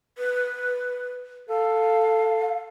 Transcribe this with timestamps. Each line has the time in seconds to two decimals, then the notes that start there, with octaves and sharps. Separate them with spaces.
0.18 B4
1.50 A4 F5